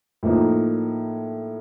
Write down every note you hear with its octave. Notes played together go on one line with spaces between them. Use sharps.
A2 F3 A#3 D#4